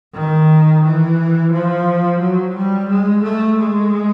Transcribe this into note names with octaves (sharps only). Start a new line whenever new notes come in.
D#3
E3
F3
F#3
G3
G#3
A3
G#3